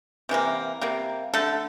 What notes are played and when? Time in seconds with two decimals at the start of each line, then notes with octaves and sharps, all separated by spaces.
0.29 C3 E3 G3 A#3
0.81 C3 G3 A#3
1.34 D3 A3 A4